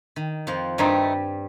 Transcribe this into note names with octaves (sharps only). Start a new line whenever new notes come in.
D#3
F2 F3
G2 D#3 G3 A3 C4 D#4